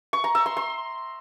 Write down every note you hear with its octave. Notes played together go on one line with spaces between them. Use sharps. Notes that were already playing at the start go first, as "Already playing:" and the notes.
C#6
A#5
E6
C6
C6